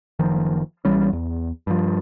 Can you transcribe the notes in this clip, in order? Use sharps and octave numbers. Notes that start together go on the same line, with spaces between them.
F#1 D#3 F3
A#1 E3 G3 C#4
E2
G2 F3